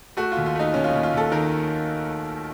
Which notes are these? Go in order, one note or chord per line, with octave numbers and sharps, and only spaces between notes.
A3 F#4
F4
D#2
F4
A3 D#4
D#2 C#4
F4
D#2 D#4
F4
D#2 A4
D#3 A#4